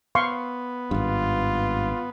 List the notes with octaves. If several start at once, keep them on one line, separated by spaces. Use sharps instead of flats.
B3 F5 C6 C#6
G#1 G2 F4